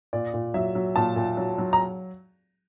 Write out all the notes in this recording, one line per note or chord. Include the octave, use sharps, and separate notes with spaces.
A#2 D5
A#2
F#3 E5
F#3
A#2 A5
A#2
F#3
F#3
A#5